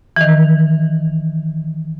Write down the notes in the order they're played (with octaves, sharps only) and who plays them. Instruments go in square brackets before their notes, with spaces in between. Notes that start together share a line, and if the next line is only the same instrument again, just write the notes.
[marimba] D#3 E3